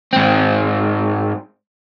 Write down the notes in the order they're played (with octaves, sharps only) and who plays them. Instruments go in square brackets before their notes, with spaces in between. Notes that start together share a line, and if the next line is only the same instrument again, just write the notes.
[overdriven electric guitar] G#2 C4